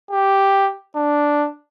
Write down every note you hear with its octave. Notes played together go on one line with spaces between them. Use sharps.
G4
D4